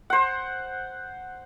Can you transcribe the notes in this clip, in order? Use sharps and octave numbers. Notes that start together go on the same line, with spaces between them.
C5 F#5